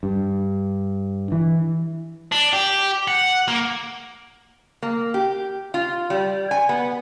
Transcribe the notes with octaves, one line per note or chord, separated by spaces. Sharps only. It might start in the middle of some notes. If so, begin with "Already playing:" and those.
G2
E3
D4
G4
F#5
A#3
A#3
G4
F4
G3
G#5
B3